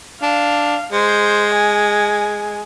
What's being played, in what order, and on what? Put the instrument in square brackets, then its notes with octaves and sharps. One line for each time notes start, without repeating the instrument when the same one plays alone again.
[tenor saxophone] D4 [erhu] F5
[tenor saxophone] G#3 [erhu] C5
[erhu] G#5